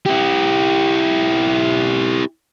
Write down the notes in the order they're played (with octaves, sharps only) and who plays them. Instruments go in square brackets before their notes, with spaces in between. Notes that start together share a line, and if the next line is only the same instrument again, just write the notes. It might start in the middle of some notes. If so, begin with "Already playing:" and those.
[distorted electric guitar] E4 G4